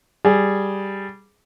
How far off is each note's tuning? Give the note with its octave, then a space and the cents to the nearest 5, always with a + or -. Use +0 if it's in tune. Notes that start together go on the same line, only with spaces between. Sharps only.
G3 +0 G#4 +0